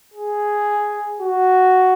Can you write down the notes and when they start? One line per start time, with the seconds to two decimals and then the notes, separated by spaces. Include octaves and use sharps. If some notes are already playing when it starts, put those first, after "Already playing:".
0.14 G#4
1.21 F#4